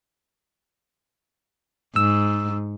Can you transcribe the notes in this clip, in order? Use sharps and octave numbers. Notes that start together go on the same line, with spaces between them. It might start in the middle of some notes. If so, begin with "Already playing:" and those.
G#2 E6